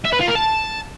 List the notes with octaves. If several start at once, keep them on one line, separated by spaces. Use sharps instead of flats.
E5
B4
F4
A#4
A5